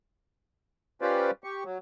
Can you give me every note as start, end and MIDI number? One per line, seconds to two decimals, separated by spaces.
1.01 1.31 61
1.01 1.31 65
1.01 1.31 67
1.01 1.31 71
1.01 1.31 72
1.01 1.31 74
1.44 1.64 67
1.44 1.64 85
1.65 1.78 54